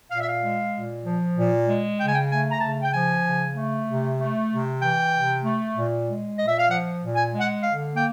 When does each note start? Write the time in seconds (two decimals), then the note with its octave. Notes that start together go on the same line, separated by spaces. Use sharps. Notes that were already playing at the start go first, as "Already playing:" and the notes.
0.10 A#2 F5
0.20 E5
0.29 F5
0.42 G#3
0.73 A#2
1.04 F3
1.36 A#2
1.67 G#3
1.99 C#3 G5
2.07 G#5
2.15 G5
2.29 A3 G#5
2.51 A#5
2.61 C#3 A5
2.82 G5
2.92 F3 G#5
3.24 C#3
3.55 A3
3.87 C3
4.18 A3
4.49 C3
4.81 E3 G5
5.12 C3
5.44 A3
5.75 A#2
6.07 G#3
6.37 A#2 D#5
6.48 E5
6.59 F5
6.69 F3 F#5
7.01 A#2
7.16 G#5
7.31 G#3
7.40 F#5
7.63 D3 F5
7.95 A#3 G5